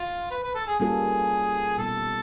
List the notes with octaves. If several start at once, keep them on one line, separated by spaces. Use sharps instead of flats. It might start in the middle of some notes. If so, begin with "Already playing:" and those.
Already playing: F4
B4
B4
A4
G#4
G3 A#3 C#4 F4 G#4 A4
B2 G3 B3 D#4 A4